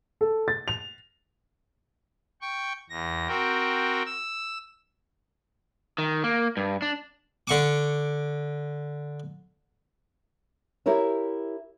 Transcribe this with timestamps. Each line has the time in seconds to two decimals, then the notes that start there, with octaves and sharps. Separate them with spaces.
0.21 A4
0.48 A6
0.68 F7
2.41 G5 C#6
2.90 E2 A#6
3.28 C4 F#4 A#4 G5
4.06 E6
5.98 D#3
6.24 A#3
6.57 G2
6.82 D4
7.47 D3 C#6 D6
10.86 E4 G4 A#4 C#5 E5